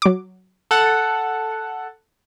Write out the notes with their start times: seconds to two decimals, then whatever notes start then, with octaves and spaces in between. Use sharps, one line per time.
0.02 F#3 D6
0.71 A4 F#5